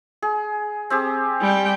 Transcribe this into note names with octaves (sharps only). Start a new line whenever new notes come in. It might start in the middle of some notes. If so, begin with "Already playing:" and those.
G#4
C4 G4 G#4
G3 G5